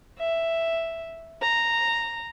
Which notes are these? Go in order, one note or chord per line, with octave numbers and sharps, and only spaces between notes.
E5
A#5